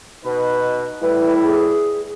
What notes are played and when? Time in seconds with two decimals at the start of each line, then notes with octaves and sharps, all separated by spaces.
0.24 B2 D#4 B4
1.02 A2 G3 E4 B4
1.44 G#4